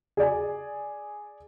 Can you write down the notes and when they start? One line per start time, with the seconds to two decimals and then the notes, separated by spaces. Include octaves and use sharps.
0.17 G#4 D5 G#5